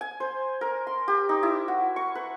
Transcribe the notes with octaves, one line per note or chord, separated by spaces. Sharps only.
G#5
C5
A#4
C6
G4
D#4
E4
F#4
C#6
B4